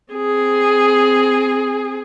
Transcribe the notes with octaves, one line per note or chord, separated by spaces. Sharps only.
C4 G#4